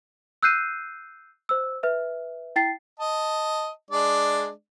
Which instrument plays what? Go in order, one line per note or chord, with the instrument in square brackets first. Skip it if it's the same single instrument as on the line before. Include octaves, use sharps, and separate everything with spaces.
[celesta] E6 F#6 G6 C7 D#7
C5 E6
B4 E5
E4 G5 A6 C7
[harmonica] D#5 A5
G#3 D4 D5